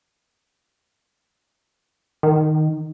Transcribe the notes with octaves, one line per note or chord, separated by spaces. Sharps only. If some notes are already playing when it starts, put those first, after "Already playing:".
D#3